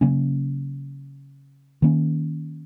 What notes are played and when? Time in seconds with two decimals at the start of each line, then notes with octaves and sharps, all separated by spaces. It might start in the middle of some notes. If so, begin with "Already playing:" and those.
0.01 C#3 F#3 A#3 C#4
1.82 D#3 A#3 C#4